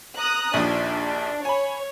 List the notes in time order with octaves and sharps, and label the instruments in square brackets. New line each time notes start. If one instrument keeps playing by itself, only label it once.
[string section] A#5 D#6 F#6
[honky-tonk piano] A#1 D#2 F3 [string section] D4
[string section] C#5 [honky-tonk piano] G#5 B5